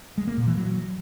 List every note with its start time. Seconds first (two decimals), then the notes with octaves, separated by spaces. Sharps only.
0.18 G#3
0.27 A#3
0.37 A#2
0.47 E3
0.57 F#3